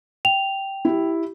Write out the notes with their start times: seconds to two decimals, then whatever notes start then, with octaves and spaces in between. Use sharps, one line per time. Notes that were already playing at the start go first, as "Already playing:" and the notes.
0.25 G5 F7
0.85 E4 G4